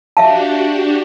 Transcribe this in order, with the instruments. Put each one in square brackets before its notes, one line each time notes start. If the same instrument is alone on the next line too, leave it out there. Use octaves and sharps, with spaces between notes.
[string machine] D4 F#4 G4 [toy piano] E5 F5 A5